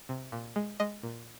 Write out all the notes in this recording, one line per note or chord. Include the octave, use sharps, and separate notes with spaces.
C3
A#2
G#3
G#3 D#5
A#2